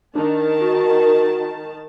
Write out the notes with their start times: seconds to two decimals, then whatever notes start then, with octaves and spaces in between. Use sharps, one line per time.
0.16 D#3 D4 A5
0.61 F#4